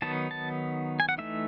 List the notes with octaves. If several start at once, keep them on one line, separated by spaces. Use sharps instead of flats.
D#3 F#3 B3 D#4 A5
A5
G#5
F#5
E3 A3 D#4 E5